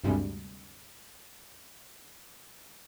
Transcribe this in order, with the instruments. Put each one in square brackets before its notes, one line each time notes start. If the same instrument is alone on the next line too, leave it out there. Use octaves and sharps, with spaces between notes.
[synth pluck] D2 G2 C3 G3 G#3